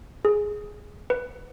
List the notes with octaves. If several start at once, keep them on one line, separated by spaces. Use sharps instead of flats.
G#4
B4